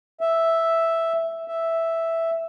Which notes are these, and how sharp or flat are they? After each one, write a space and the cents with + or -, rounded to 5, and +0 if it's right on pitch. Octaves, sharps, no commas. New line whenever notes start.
E5 +0
E5 +0